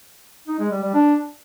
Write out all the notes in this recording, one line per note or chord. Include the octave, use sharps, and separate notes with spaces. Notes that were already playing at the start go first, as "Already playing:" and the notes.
D#4
G#3
G3
G3
D4